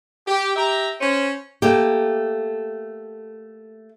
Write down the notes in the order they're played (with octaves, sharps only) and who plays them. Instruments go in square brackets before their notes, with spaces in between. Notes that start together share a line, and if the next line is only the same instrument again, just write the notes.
[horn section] G4
G4 E5 A#5
C#4 C5
[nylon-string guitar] A3 A#3 G4